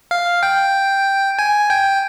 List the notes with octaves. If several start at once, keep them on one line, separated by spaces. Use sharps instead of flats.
F5
G5
G#5
G5